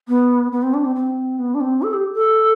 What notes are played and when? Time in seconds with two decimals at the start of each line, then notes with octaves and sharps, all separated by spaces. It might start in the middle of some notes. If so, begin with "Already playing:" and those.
0.08 B3
0.52 B3
0.63 C4
0.74 D4
0.85 C4
0.96 C4
1.39 B3
1.54 D4
1.61 C4
1.82 A4
1.94 G4
2.14 A4